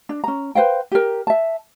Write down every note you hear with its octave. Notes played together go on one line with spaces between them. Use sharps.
D4
C#4 A#5
B4 C5 F5 G5
G4 A#4
E5 A5